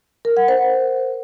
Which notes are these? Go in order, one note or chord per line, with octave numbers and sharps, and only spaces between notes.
A#4
F#5
C5